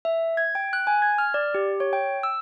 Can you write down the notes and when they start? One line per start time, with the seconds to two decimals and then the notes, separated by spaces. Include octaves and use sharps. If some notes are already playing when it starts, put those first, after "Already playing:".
0.05 E5
0.37 G#6
0.55 G5
0.73 F#6
0.87 G#5
1.02 G#6
1.18 F6
1.34 D5
1.55 G4
1.80 C#5
1.93 G5
2.23 E6